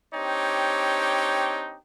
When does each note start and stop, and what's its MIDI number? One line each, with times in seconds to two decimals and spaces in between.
0.14 1.77 60
0.14 1.77 62
0.14 1.77 63
0.14 1.77 67
0.14 1.77 73
0.14 1.77 79